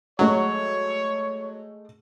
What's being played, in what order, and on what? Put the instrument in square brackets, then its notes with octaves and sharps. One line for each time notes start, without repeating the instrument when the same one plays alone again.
[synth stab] F#3 [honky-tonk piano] G#3 A3 [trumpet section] C#5